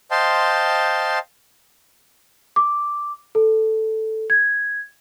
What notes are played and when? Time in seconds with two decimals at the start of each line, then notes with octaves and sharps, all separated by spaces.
0.11 C5 D#5 F5 G5 A5 C6
2.56 D6
3.35 A4
4.30 G#6